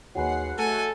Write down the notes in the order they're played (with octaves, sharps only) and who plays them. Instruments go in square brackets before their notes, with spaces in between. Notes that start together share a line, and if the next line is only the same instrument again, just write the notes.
[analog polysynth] D#2 F#5 C7 [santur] F#3 G#3 B4
[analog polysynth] A3 F#4 [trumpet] A4 [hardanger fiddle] G#5